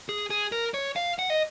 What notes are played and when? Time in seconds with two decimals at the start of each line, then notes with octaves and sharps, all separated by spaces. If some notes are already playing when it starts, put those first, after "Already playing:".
0.09 G#4
0.30 G#4
0.52 A#4
0.74 C#5
0.96 F5
1.19 F#5
1.30 D#5